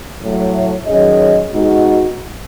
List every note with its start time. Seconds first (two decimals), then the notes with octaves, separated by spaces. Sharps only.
0.22 A2 F#3 A3
0.87 D#3 F#3 C#4 G#4 D#5
1.52 B2 G#3 D#4 F#4